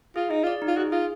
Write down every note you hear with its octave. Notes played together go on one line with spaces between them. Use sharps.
F4 G#4
D#4 G#4
F4 D5
D#4
F4
F#4 G#4
F4 G#4